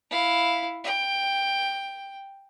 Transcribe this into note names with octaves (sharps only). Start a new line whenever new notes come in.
E4 F5
G5